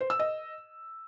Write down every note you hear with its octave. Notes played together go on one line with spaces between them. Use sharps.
C5
E6
D#5